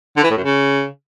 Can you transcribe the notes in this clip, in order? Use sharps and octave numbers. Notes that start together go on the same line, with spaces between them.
D3
E3
A2
F#2
C#3